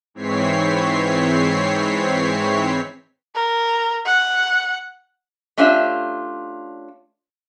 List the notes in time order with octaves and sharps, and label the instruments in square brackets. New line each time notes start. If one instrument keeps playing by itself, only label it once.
[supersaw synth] G#2 E3 C4 C#5 B6 C7
[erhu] A#4
F#5
[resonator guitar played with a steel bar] A3 C#4 D4 F4 G4 E5